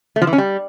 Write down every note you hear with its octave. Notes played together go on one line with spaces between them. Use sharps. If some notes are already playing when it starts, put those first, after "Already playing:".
A3
F3
E3
C#4
G3